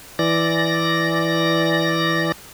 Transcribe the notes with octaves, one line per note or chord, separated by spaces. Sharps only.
E3 D5 A#6